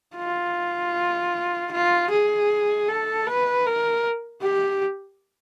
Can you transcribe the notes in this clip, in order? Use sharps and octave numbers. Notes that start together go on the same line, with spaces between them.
F4
F4
G#4
A4
B4
A#4
G4